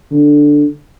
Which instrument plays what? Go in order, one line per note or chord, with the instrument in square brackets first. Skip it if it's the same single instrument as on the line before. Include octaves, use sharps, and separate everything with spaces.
[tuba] D3